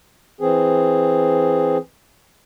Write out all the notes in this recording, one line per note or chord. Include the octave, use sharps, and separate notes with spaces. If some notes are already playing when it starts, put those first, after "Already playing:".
E3 C4 G#4